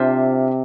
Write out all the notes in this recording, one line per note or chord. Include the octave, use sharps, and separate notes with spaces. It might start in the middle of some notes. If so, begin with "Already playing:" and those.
Already playing: C3 D4 F4 C5 E5